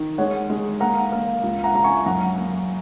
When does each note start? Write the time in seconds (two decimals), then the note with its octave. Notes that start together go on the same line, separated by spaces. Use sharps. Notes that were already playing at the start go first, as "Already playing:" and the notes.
Already playing: D#3
0.18 G#3 C#5 F#5
0.50 G#3
0.80 A#3 F#5 A#5
1.12 A#3
1.43 C#2
1.64 F#5 A#5
1.74 C#2 A#5
1.84 G#5 C#6
2.06 F#2 F#5 A#5
2.37 A#3